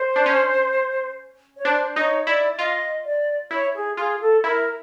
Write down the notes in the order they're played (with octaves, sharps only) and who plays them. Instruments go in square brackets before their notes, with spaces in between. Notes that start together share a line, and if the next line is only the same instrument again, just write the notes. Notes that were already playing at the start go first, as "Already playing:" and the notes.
Already playing: [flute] C5
[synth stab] D4
C#4
[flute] C#5
[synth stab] D4 [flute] C5
[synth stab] D#4 [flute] C#5
[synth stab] E4 [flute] D5
[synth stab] F4 [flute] D#5
[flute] D5
[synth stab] E4 [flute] C#5
[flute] G#4
[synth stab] F4 [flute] G#4
[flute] A4
[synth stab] E4 [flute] A#4